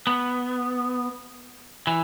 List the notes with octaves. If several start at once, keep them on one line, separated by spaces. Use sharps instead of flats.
B3
E3